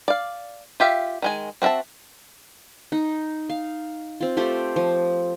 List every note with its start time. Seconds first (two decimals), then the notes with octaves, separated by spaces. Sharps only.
0.08 D5 F5
0.80 F4 G4 E5 F5
1.22 D#3 G#3 G#5
1.62 C4 F#4 A#4 E5 A5
2.92 D#4
3.50 F5
4.21 C4 F4
4.37 A3 F4 G4 C5
4.76 F3